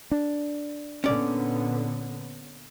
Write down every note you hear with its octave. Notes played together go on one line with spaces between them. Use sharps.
D4
A#2 D3 B3 C#4 D5